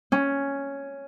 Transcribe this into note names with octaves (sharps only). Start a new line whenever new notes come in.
C#4